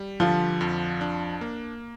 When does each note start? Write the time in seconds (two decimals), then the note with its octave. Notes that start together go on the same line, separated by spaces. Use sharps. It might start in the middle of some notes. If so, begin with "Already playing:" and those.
Already playing: G3
0.20 D3 F3 F4
0.61 F2
1.01 D4
1.41 A#3